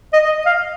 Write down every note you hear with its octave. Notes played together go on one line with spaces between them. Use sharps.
D#5
D#5
F5